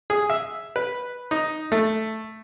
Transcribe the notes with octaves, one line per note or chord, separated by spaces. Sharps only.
G#4
E5
B4
D#4
A3